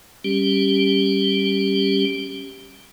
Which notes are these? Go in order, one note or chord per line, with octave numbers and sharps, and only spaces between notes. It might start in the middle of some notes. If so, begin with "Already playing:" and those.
G3 C#4 G4